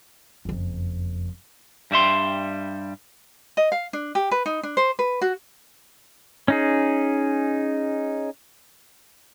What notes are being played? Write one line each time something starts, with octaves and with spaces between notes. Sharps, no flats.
F#1 F2
G2 G3 E5 C6
D#5
F5
D4
G4
B4
D#4
D4
C5
B4
F#4
C#4 D#4 G#4